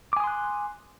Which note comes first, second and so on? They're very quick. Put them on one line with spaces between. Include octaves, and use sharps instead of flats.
D6 G#5 D#6 C6 F#6